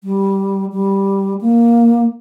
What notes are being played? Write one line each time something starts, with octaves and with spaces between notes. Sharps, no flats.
G3
G3
A#3